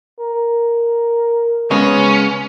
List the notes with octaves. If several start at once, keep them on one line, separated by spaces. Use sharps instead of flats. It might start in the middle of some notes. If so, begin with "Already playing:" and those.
A#4
C#3 G#3 B3 C#4